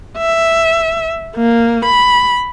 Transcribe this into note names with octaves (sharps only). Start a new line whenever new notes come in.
E5
A#3
B5